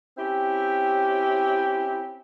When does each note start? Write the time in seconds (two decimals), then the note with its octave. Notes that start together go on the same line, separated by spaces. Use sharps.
0.18 C4 C#4 E4 G4